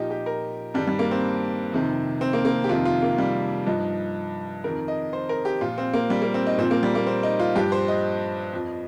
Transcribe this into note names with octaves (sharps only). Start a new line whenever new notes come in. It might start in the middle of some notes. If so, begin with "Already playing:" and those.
Already playing: A#2 F3 D#4 G4
G4
A#4
G2 D#3 G3
G3
A#3
C4
F2 C3 D#3
C4
A#3
A#3
G4
F2 C3 D#3 F4
F4
A#3
G3
G2 F3 D#4
F2 D#3 A#4
D#5
C5
A#4
G4
A#2 F3 F4
C4
A#3
G3
A#3
C4
D#4
A#2 F3 C4
A#3
G3
A#3
C4
D#4
F4
G2 F3 G4
C5
D#5
F2 F3